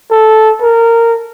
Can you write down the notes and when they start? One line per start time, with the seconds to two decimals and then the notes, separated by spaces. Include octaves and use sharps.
0.11 A4
0.62 A#4